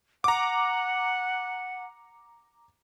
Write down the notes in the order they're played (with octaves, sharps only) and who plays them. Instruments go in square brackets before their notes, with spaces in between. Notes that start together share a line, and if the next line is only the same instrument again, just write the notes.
[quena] F#5 [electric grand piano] A#5 D6